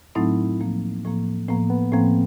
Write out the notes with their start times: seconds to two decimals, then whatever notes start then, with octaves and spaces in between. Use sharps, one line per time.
0.15 A2 F#3 A3 C4 D#4 E4
0.60 A2 F3 A#3
1.04 A2 F3 A#3
1.49 A2 F3 A#3 B3
1.70 B3
1.92 A2 F3 A#3 C4